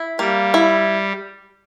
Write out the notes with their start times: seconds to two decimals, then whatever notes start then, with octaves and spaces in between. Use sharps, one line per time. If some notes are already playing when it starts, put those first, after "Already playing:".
Already playing: E4
0.19 G3 A#3
0.54 E4